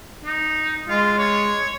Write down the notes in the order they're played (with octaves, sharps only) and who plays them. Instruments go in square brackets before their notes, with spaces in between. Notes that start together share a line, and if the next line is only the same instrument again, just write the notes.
[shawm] D#4
[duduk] G#3 [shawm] F4
[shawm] C#5